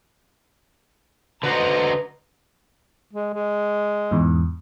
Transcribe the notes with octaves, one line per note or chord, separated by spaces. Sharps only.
D3 F#4 B4 C5 D#5 F#5 A#5
G#3
G#3
E2 G#2